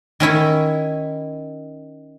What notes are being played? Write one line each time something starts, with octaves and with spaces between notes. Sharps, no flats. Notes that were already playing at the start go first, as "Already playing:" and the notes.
D#3 C#4 E4 C#5